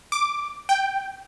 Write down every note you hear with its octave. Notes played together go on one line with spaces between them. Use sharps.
D6
G5